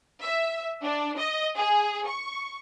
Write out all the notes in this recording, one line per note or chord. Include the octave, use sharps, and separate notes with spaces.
E5
D4
D#5
G#4
C#6